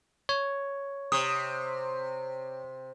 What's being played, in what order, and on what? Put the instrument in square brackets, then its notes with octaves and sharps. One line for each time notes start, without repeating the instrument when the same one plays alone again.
[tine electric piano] C#5
[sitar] C3 [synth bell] D#6